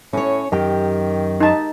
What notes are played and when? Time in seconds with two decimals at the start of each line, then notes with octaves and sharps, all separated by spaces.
0.13 A2 C#4 C#5
0.52 F#2 D#3 G4 G5
1.40 D#4 A5